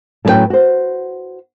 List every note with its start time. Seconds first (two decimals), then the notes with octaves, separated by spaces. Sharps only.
0.25 A2 F#3 C#4 D4 B4 G5
0.50 F#4 C5